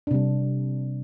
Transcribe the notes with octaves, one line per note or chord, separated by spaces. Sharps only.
C3 G3 D4